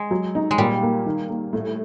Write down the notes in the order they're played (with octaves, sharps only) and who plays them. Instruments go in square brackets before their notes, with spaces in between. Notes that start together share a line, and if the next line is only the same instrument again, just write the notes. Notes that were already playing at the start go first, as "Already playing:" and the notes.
Already playing: [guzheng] G#3
[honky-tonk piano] F#3
D#4
[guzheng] G#3
[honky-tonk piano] A#2 [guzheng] G3
[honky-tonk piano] A#3
D#3
A#3
A2